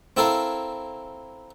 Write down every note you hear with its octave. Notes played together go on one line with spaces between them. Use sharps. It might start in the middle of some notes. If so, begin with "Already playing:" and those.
C4 E4 A4 A#4 F5